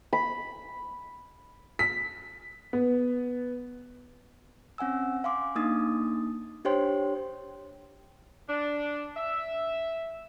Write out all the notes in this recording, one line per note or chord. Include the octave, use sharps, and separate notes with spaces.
B5
B6
B3
C4 C#4 F#5 G#5 E6
F5 G#5 C6 D6
A#3 D4 D#4 D#6 A6
D4 G4 C5 C#5 G5 C6
D4
E5